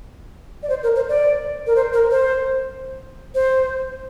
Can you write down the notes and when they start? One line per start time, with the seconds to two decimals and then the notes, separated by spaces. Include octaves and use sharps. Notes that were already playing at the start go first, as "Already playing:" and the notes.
0.63 D5
0.69 C5
0.83 A#4
0.95 C5
1.09 D5
1.67 A#4
1.75 C5
1.93 A#4
2.10 C5
3.35 C5